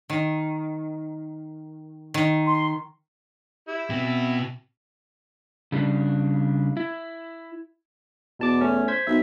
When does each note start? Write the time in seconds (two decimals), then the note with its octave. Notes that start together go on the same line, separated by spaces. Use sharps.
0.10 D#3
2.14 D#3
2.47 C6
3.68 E4 G4
3.90 B2 B3 C4
5.72 C#3 G3 D4
6.77 E4
8.39 E2 B2 A5 D6
8.60 A3 C#4
8.88 C5 G#6 B6
9.07 B1 E5